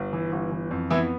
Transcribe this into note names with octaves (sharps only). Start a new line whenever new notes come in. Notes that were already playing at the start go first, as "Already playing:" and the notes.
Already playing: G1
E3
G1
E3
F2
E3 B3 E4